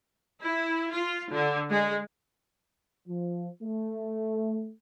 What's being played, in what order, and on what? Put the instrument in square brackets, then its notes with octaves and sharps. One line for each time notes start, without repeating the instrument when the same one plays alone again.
[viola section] E4
F4
D3
G#3
[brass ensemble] F3
A3